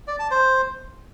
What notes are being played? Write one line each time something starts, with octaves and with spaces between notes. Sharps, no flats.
D5
A5
C5